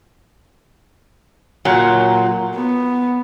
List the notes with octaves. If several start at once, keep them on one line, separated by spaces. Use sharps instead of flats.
A#2 F#3
B3